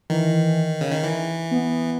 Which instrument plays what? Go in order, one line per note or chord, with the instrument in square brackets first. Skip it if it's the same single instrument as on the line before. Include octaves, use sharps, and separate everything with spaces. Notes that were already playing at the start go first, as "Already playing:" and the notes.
[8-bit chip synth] D#3 [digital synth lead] E3
[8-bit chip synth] C#3
D#3
E3
[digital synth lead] B3